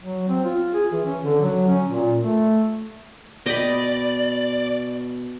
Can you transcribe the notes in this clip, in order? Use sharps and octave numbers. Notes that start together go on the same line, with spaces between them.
F#3
C4
F4
G#4
E3
C#4
D3
F#3
C#4
A#2
A3
B2 D5 D#5 G5 B5